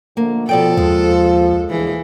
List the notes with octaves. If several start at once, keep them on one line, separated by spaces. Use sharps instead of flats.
D3 F3 A3 A#3
B2 F3 A4 D5 G5
D#2 G#3
D2 A#2 E3 G#4